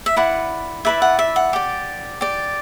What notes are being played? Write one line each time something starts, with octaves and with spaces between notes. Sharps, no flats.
E5
E4 B4 D5 F#5
E4 B4 D5 E5
F#5
E5
F#5
G4 D5
G4 D5